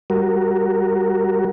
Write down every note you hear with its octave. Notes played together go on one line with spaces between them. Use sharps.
G3 F#4 A#4